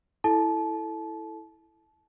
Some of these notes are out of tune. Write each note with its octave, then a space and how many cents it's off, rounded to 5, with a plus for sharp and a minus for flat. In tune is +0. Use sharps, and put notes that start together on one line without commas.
E4 +0 A4 +0 A5 -30